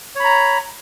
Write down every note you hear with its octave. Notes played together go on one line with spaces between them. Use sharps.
C#5 A#5 B5